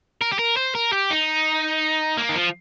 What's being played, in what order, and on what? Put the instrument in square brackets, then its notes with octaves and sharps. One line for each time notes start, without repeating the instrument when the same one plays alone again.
[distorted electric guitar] A#4
G4
A#4
C5
A#4
G4
D#4
A#3
D#3
F3